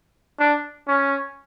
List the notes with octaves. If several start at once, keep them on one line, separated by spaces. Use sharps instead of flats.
D4
C#4